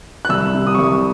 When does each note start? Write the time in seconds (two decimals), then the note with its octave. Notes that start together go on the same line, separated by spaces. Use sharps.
0.25 F#6
0.29 C2 E6
0.55 C3
0.67 D#6
0.75 C#6
0.78 C2
0.84 D#6